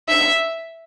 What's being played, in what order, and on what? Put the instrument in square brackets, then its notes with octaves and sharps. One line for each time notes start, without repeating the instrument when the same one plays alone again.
[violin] E5